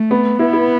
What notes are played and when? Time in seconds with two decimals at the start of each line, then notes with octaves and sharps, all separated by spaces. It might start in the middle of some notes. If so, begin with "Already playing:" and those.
Already playing: A3
0.11 B3
0.39 B3 E4
0.53 E4